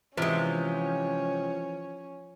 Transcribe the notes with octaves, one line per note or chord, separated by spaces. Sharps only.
C3 E3 F3 G#3 C#4